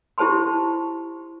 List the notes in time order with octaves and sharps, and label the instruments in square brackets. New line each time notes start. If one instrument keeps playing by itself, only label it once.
[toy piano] E4 G4 C5 A5 B5 C6